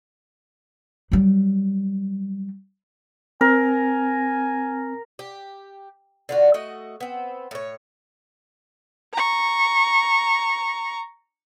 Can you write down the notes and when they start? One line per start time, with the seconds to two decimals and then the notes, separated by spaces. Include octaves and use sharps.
1.12 F#3 G3
3.41 C4 A#4 G#5
5.19 G4
6.29 D3 F4 F#4
6.54 A3 F#4 D#5
7.00 B3 C4
7.51 A2 C#5
9.13 A#5 C#6